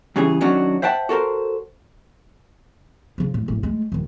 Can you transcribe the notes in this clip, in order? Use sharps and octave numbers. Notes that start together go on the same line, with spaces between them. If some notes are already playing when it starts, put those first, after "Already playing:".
G2 C#3 E3 C#4 G#4
D#3 F#3 C#4 D4 F#4
C5 E5 F#5 G5 A5
F#4 A4 A#4 C5
C#3 F3
A2
G#1 A2
G#3 A3
D#1 D#3